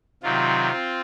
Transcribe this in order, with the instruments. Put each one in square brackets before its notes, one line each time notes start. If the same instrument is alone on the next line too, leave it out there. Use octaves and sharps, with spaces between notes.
[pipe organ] C3 D#3 F#3 C4 F4
C4